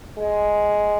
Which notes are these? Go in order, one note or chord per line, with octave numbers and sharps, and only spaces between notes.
G#3